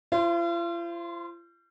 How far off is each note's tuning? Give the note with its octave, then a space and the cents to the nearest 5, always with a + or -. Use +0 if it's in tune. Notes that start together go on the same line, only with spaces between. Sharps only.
F4 -45 C5 +0